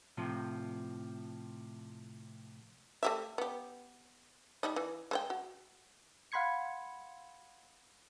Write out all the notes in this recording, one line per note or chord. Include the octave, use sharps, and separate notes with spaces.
A2 C3 F3
A3 G4 E5
B3 G4
G3 D#4 D#5
E3
G#3 C5 G5
F#4
F5 F#5 B5 C6 G#6 C#7